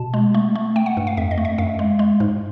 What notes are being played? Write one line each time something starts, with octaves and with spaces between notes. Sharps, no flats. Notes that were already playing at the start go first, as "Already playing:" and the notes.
Already playing: B2 A5
G#3
A3
A3
A3 G5
F#5
G2
F5
F2 E5
D#5
A3
E5
F#2 F5
G#3
G#3
G#2